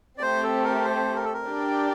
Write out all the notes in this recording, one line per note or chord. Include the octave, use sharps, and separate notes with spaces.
D5
A3 C4 G4 C5
A4
A#4
C5
A#4
A4
A#4
D4 G4 D5 G5